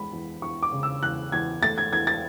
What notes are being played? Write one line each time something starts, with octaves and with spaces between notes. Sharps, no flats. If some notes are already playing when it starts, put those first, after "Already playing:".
Already playing: E2 G#3 B5
E2
E2 C#6
D6
C#3
E6
E2 F#6
E2 G#6
A3 A6
G#6
E2 G#6
A6